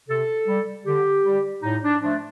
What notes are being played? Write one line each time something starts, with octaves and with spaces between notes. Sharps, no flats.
C3 A4
G3
D3 G4
G3
A2 D#4
D4
F3 A3 D4